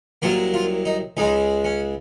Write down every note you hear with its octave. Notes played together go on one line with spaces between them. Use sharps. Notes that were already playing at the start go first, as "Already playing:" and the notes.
C2 C3 F#3 A#3 F4
F4
D#4
C#2 C#3 G#3 D#4
C#4